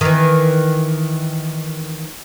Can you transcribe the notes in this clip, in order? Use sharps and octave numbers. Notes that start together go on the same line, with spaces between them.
D#3 E3